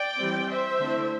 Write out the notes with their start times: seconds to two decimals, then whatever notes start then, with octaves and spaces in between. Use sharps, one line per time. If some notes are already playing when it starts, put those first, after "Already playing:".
Already playing: D5 G5
0.17 E3 G3 C4
0.48 C5 E5
0.78 D3 A3 C4 E4